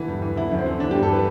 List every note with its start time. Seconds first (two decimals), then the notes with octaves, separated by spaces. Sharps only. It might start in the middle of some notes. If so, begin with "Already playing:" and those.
Already playing: D3 E3
0.08 G2
0.22 E3
0.36 D3 E4
0.52 F#2
0.58 C4
0.66 D3
0.80 E3 D4
0.91 G2 G4
1.03 A4
1.09 E3 B4